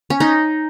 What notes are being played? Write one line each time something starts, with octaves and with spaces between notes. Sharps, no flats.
C#4
D#4